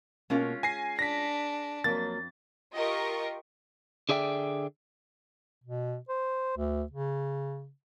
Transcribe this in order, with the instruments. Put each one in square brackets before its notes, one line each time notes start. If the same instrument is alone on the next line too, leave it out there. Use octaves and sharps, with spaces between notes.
[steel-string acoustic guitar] B2 A#3 [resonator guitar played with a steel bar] G#3 C#4 F4
[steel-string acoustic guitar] G#4 [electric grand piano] G#5 A#6 C7
[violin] D4 [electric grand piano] A#6 B6
[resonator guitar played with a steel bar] F2 [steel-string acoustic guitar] F#3 A#3 [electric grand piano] A6
[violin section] F4 G4 A#4 D#5 C#6
[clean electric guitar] D3 G#4 D5 E5 G5
[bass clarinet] B2
C5
D2
C#3